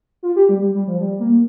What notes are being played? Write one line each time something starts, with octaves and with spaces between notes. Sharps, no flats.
F4
G4
G3
G3
G3
F3
G3
A#3